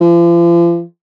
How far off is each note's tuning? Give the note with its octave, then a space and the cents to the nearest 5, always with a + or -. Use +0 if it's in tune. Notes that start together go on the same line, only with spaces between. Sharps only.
F3 -40